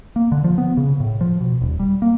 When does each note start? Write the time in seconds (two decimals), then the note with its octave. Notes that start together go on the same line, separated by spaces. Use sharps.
0.16 A#3
0.32 D3
0.44 F3
0.58 B3
0.77 C#3
1.00 A2
1.21 F3
1.41 B2
1.62 D#1
1.79 G3
2.02 A#3